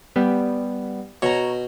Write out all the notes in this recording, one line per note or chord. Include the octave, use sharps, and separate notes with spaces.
G3 B3
B2 C#5 A#5